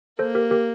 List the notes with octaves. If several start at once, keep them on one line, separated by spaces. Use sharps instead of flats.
A#3 A4 C5
G4 A#4
G4 A#4